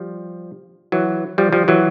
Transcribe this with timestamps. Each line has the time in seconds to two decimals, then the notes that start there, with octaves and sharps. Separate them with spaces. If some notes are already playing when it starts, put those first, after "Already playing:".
Already playing: F3 G3
0.92 E3 F#3
1.38 F3 G3
1.53 F3 G3
1.68 E3 F#3